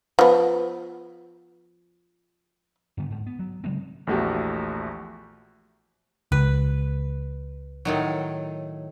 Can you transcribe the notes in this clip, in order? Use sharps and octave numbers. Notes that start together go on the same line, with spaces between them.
F3 B3
G2 D3 B3
G#2
B3
F#3
C#3 F#3 G#3 C4
A#1 E2 A3 F#4 G4
C#2 B4
A2 D#3 F#3